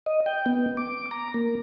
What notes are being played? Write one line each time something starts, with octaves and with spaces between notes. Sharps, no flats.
D#5
G5
B3
D6
A#5
A#3